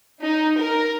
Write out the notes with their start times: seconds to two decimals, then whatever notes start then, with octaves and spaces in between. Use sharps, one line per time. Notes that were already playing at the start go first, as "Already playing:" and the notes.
0.22 D#4
0.60 A#4